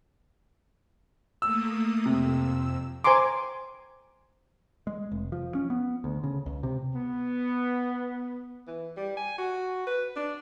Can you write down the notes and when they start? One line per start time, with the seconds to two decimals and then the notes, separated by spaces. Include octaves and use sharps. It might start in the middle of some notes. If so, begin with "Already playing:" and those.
1.42 A3 A#3 D#6 E6
2.06 F2 C3 E6
3.04 C5 G#5 A#5 C6 D6
4.87 G#3
5.11 F1
5.32 F3
5.55 C#4
5.70 B3
6.04 D2
6.24 C#3
6.46 C#2
6.63 C3
6.95 B3
8.67 E3
8.96 G3
9.17 G#5
9.38 F#4
9.87 B4
10.16 D4